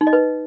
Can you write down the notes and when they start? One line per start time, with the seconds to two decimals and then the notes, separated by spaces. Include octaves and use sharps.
0.01 D#4
0.07 D#5
0.13 B4